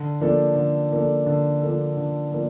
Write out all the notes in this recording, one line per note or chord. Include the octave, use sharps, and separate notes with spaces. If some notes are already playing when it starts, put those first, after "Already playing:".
Already playing: D3
F3 A#3 D4 A4
D3
F3 A#3 D4 A4
D3
F3 A#3 D4 A4
D3
F3 A#3 D4